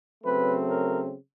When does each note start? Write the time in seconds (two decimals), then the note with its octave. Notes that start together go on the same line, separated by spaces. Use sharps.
0.24 C#3 F#3 A3 C4 B4
0.68 A#4